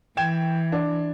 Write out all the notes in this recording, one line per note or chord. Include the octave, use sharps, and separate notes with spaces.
E3 G5 G#6 E7
D4